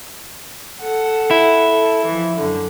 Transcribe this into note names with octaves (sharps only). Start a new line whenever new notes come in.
A4 F#5
E4
A4
E3 F3
F#2 D3